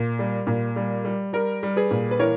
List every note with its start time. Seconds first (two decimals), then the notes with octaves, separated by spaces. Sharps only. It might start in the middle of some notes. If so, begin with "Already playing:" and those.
Already playing: A#2
0.19 G3
0.47 A#2
0.76 G3
1.05 G3
1.33 G3 A#4
1.63 G3
1.76 G#4 B4
1.91 A#2
2.11 B4
2.19 E3 A#4 C#5